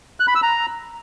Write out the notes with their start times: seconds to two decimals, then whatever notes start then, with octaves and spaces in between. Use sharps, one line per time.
0.20 F#6
0.27 B5
0.35 E6
0.43 A#5